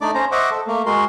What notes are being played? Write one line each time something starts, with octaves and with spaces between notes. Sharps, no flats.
A3 D4 D#4 D5 D6
C#4 C5 A#5
C5 D#5 E5 F#5 C#6 D6
A4
A3 A#3
G#3 F#4 A#4 C6